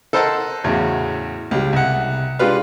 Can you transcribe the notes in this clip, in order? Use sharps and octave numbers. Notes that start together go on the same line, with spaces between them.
A4 A#4 C5 D#5 F#5 A5
E2 A2 C#3 F#4
C#2 G3
C2 F#5
G#3 D4 F4 G4 B4 F5